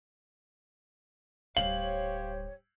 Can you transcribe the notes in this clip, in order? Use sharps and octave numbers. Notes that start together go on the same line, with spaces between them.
D1 G3 G4 C5 C#5 F5 F#7